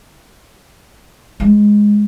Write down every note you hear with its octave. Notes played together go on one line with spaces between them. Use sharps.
G#3